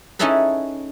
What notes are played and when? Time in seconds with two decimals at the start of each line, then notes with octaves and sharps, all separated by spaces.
0.19 C#4 D#4 E4 G#4 A4 B4